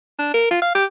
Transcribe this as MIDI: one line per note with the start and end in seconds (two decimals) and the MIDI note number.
0.19 0.33 62
0.34 0.46 70
0.51 0.58 65
0.62 0.71 77
0.75 0.85 67